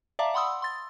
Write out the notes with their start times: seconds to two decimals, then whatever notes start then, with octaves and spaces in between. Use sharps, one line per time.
0.19 D5 E5 F5 A5 A#5 D6
0.34 F#5 B5 C6 D#6 E6
0.62 C6 A6